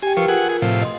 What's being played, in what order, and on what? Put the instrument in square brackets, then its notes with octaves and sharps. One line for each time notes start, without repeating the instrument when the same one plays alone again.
[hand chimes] G4 G5 [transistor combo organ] G#5
[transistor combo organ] F3 C#6 [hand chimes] A#4 B4
[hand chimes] F4 A#4 [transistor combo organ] G#4 F#5
[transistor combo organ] G#4
A2 C3 F3
[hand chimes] D#5 C6